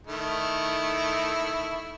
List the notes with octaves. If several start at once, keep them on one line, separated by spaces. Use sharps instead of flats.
D#3 A3 E4